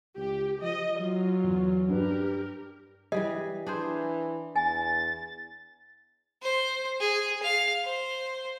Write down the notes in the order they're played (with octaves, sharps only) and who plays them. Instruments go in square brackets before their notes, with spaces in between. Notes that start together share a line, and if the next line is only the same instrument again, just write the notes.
[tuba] C#2 [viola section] G4
[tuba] F3 [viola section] D#5
[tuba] F#3 [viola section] F4
[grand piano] E2
[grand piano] G2 D4 B4 [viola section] G4 A#4
[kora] E3 G3 G#4 [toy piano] D#5
[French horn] E3 [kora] D4 G#4 C5
[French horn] E2 [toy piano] G#5 [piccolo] A6
[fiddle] C5
G#4
F5
C5